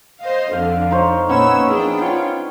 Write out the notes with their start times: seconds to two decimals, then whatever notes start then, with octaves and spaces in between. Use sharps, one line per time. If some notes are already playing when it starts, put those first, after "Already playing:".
0.21 C5 D#5 F5
0.52 F2 D3 F5
0.91 D#4 C5 C#5
1.29 A#2 B3 C#4 E6
1.69 F3 A#3 D4 G#4 G5
2.01 C#4 F4